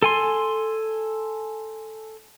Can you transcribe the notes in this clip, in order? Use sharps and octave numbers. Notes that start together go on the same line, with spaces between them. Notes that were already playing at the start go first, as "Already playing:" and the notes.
A4 G#5 C6